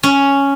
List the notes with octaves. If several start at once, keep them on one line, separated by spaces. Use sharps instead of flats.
C#4